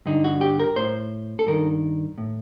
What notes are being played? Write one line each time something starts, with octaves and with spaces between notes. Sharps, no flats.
G2 D3 D#4
F#4
G4
A#4
A2 C5
A4
G2 D#3 A#4
A2